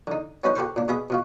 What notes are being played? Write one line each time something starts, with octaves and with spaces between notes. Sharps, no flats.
D3 D#4
B3 C#4 D#4 F#4 B4 C5
F#4 G4 A4 B4 C5 C#6
A#2 D4
B2 B3 G#4 E5 B5
B2 F4 F#4